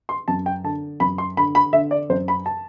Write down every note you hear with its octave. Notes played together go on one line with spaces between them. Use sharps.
C6
F#2 A5
G5
D3 A5
F#2 B5
C6
D3 B5
B5
D3 E5
D5
F#2 C5
B5
A5